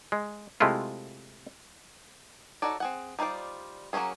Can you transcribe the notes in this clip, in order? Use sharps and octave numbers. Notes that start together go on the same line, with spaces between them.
G#3
C3 G#3 A3 E4 F4
D#4 F#4 A4 C#5 D5
C4 G#4 F#5
G3 D#4 F4 C5 D5
F#3 A#3 C4 C#4 G#4